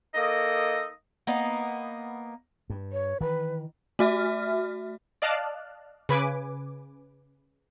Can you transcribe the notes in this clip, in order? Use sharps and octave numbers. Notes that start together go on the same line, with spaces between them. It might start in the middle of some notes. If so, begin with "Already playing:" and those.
A#3 D#4 A4 D#5
A#3 B3 D#4
G2
C#5
D#3 E3 B4
A3 F#4 E5 F6
D5 D#5 F5 A5 F6 F#6
C#3 B4 G#5 D6